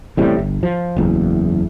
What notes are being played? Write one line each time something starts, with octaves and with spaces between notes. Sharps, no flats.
A1 A2 C3 G3
G1
F3
F#1 E2